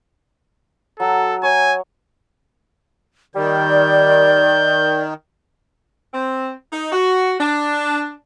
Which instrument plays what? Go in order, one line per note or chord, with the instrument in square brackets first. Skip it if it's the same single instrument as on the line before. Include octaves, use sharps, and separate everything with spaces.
[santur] F#3 [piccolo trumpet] A4
[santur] C#5 [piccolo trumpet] G#5
[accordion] D#3 [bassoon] G3 [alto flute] D5 [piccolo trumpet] G6
[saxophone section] C4
D#4
F#4
D4